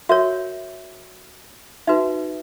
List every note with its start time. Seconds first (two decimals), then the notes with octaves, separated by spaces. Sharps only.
0.09 F#4 A#4 C#5 E5
1.87 D#4 F#4 B4 E5